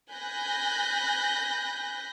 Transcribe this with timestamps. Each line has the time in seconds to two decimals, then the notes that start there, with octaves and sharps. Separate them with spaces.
0.12 G#5 B5 F#6 G6 A#6